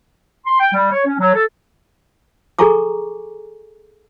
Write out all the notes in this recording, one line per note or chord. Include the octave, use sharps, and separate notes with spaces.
C6
G5
G3
C#5
C#4
F#3
A4
G#4 A4 G#5 A#5 C#6 D6